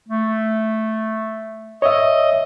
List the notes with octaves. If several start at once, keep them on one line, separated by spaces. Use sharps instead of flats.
A3
C#5 D#5 E5